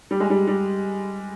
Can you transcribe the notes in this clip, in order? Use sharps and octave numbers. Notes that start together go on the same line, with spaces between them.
G3
G#3
G3
G3